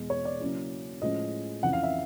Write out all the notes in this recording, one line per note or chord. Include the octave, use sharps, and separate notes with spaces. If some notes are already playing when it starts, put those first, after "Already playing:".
Already playing: E2 B2 G#3
C#5
D5
C#3 F#3 A#3 C#4 E4
A2 F3 G#3 C#4 D#5
F2 C#3 E3 F#5
F5
E5